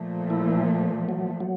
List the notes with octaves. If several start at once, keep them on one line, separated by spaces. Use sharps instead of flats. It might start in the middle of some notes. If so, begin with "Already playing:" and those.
Already playing: A#2 F3 A3
E4
F#3
F#3